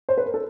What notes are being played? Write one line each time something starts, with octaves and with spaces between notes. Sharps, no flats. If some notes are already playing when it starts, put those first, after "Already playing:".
C5
B4
A#4
A4